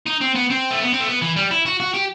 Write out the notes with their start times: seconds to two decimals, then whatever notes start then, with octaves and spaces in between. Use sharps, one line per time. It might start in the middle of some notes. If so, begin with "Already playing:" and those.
0.06 D#4
0.21 C4
0.35 B3
0.50 C4
0.71 A3
0.82 B3
0.93 C4
1.00 A3
1.08 B3
1.22 E3
1.37 G3
1.51 E4
1.66 F#4
1.80 F#4
1.94 G4